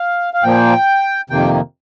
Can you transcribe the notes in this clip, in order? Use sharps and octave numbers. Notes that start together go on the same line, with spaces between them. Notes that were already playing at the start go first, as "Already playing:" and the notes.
Already playing: F5
F5
A#2 F3 A#3 G5
F2 C3 D#3 A#3 G5